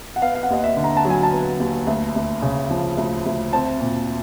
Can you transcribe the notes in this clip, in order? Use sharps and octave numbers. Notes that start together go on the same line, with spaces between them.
F#5
B3 F5
F5
F#5
D#2 D#5
E5
D3
A#5
A5
F#3
G#5
A5
B3
D#2
D2
D2
C#3
F3
D2
D2
C4 A5
A#2